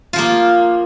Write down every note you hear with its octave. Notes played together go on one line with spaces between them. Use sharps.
F3 A#3 F4